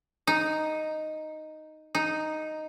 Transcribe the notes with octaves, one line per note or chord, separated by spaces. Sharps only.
D#4
D#4